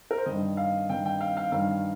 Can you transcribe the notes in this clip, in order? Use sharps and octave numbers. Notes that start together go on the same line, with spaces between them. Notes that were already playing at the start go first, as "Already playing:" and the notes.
A#4
C5
G2 D#3 D#5
F5
G2 D#3 G5
G5
F5
F5
G2 D#3 F5